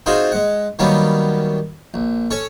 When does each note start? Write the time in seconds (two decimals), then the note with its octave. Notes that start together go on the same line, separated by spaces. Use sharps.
0.06 C4 D#4 F4 F#4 G#4 C5
0.32 G#3 F#5
0.79 D#3 F#3 G3 A#3 B3 C#4
1.94 A#1
2.31 C#4 A4 C#5